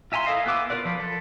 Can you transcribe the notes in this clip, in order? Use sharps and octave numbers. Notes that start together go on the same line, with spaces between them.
F4 E5 G#5 A#5 C6
E4 A4 A#4 D#5 F5
B3 F4 B4 D6 E6
F4 A#4 B4 D5
F3 B4
A4